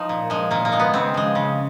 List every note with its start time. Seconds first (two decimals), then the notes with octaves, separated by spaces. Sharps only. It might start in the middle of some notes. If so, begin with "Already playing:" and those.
Already playing: F3 D#4
0.09 A#2
0.30 F3 G#3
0.51 A#2 A#3
0.65 A#3
0.72 F3 G#3
0.79 B3
0.94 C#3 C4
1.14 F3 G#3
1.35 C#3